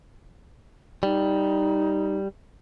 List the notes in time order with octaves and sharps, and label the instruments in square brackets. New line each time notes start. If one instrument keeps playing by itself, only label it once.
[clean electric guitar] G3 [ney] D#4